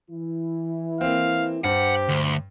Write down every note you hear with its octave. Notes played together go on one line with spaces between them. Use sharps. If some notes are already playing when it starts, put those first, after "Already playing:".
E3 E4
A#3 C4 F5
G2 G4 C5 F#5
D2